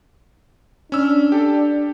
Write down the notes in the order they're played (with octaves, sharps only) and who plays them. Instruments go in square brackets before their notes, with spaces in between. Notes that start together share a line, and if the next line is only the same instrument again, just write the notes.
[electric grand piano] C#4 E6 F6 [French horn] D4
[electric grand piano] G4 A4